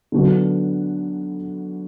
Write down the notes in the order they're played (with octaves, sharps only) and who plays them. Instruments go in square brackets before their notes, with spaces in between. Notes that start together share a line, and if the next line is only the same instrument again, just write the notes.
[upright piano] D3 F#3 B3 D4 F#4